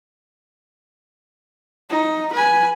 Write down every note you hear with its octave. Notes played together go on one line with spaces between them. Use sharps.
D#4
B4 G#5